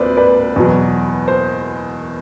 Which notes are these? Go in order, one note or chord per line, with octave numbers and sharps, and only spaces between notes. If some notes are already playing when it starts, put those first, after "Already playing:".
Already playing: D2 C3 B4 C5 D5
B4 D5
E2 B2 F#3
C5